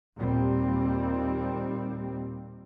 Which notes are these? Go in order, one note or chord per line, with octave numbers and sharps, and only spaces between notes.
D#2 A#2 G3 C4